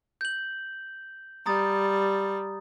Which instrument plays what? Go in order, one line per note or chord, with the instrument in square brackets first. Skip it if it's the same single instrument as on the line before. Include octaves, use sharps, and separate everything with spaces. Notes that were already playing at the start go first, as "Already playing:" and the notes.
[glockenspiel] G6 F#7
[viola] G3 [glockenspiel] A#5 D#6 A6